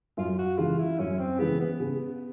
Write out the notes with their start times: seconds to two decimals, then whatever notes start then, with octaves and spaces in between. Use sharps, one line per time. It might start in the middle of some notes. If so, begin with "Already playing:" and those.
0.17 F#2 F4
0.38 F#4
0.58 C#3 E3 G#3 F4
0.79 E4
0.99 F#2 C#4
1.19 C4
1.39 C#3 E3 G#3 B3
1.60 B3
1.80 C#3